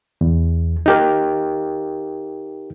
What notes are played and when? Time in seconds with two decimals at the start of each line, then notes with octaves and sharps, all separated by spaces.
0.21 E2
0.86 D#4 G4 A#4